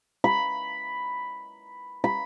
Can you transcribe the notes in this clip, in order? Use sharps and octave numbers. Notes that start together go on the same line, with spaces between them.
B5
B5